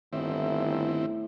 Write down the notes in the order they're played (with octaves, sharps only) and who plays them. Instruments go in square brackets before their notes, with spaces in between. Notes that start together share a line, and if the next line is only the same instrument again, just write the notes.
[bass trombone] G1 [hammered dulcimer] A2 [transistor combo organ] D#3 C4 E4